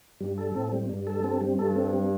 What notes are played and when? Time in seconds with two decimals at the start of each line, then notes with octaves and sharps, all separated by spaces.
0.20 G2 G3
0.38 A4
0.55 A2 C4
0.72 G3
0.89 G2 G3
1.07 A4
1.24 C4
1.41 G3
1.58 G2 A4
1.76 C4
1.93 G3